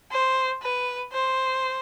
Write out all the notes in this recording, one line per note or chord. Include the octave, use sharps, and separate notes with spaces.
C5
B4
C5